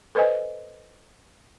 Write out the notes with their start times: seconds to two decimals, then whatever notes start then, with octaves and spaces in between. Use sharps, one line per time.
0.15 A4 B4 C5 D#5 G#5